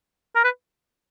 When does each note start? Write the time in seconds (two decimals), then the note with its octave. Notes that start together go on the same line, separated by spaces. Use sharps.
0.36 A#4
0.44 B4